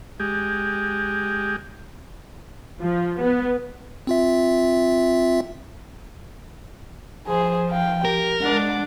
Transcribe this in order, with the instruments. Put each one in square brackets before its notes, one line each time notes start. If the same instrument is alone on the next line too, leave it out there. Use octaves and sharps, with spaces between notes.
[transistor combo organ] G#3 G4
[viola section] F3
B3
[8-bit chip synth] C4 F4 E5
[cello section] F3 [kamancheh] G#4 C5
[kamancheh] F5 G5
[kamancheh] G4 [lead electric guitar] A#4
[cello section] G#3 D4 [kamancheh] F#5 D6